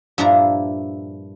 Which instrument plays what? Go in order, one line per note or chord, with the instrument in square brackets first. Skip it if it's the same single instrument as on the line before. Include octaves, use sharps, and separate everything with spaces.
[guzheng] G2 A#2 F3 D4 E4 A#5